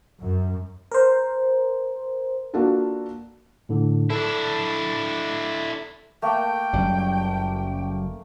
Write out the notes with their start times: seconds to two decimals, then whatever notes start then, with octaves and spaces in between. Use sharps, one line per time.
0.22 F#2
0.92 A#4 C5
2.54 A#3 D4 F4 F#4 A4 A#4
3.69 A2 D3
4.10 D4 E4 A4
6.22 A3 A#3 G5
6.73 F#1 F#2 G3